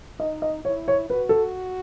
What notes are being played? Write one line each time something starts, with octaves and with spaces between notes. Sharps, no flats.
D#4 D#5
D#5
E4 C#5
C#5
F#4 B4
A4